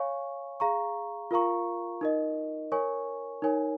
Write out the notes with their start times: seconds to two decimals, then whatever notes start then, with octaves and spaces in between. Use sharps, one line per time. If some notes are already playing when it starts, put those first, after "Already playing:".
Already playing: C#5 F5 G#5 C#6
0.60 G#4 F5 A#5 C#6
1.31 F4 A#4 F5 A#5 C#6
2.01 D#4 A#4 D#5
2.72 A#4 C#5 G#5 C#6
3.42 D#4 A#4 C#5 G#5